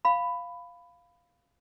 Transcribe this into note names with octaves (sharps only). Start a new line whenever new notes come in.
F5 B5